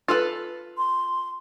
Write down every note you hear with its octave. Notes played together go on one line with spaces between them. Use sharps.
F4 A4 B4
C6